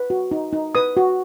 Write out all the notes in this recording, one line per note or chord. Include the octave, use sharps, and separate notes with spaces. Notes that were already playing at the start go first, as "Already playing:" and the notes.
Already playing: B4
F#4
D#4
D#4
B4 D#6
F#4